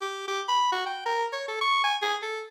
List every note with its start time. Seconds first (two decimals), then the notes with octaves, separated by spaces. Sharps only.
0.02 G4
0.28 G4
0.48 B5
0.72 F#4
0.86 G5
1.06 A#4
1.33 C#5
1.48 A4
1.61 C#6
1.84 G#5
2.02 G#4
2.22 A4